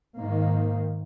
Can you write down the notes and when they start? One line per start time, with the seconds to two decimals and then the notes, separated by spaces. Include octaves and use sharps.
0.19 G#2 D#3 A#3